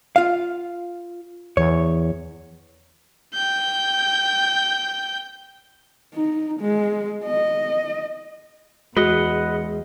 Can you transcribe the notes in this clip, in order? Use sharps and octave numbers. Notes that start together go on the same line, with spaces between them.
F4 F5
E2 C#5
G5 G6
D#4
G#3
D#5
E2 G#3 F#4 B4 D#5 F#5